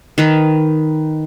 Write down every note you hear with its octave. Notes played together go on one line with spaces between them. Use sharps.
D#3 B4